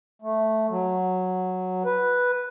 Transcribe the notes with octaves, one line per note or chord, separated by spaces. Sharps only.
A3
F#3
B4